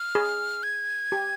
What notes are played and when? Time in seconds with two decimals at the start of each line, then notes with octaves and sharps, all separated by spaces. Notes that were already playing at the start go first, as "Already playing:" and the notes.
Already playing: F6
0.15 G#4
0.63 G#6
1.12 G4